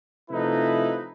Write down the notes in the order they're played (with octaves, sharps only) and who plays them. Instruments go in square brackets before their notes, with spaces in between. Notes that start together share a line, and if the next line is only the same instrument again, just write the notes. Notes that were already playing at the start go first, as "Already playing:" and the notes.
[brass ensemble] C3 F3 A3 D#4 E4 B4